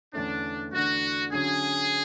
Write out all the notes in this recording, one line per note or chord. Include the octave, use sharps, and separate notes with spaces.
E2 D3 A3 C#4 D4
E2 D3 A3 D4 F#4
D3 F#3 C#4 G#4